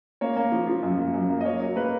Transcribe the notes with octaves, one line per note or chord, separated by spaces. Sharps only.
A#3 C#5
A#3
F3
F3
F#2
A#3
F#2
A#3
D#5
A#3 C#5
F#3
A#3 B4